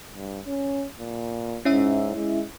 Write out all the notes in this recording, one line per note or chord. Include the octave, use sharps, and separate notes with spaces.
G2
C#4
A#2
G#2 C#4 E4 E5
G#3